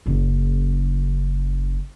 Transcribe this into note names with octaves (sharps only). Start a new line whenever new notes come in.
F#1 C#3